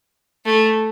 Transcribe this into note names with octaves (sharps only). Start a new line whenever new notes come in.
A3